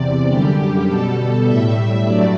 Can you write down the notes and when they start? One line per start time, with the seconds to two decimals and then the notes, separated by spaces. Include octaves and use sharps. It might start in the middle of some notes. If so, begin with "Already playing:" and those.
Already playing: E2 C3 D5
0.28 F#2 D3 G3 G4
0.87 B2 G3 A4
1.45 A2 G3 E5
2.04 G2 F#3 A3 D5